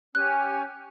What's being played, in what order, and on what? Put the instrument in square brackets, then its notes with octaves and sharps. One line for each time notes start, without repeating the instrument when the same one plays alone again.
[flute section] C#4 G4 G#5 [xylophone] F#6